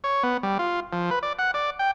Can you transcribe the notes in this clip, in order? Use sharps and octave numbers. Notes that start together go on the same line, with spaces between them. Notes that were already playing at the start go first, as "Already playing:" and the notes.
C#5
B3
G3
F4
F3
B4
D5
F#5
D5
G5